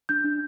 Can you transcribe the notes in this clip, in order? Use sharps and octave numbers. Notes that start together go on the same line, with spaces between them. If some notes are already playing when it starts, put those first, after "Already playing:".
D4 G6
D4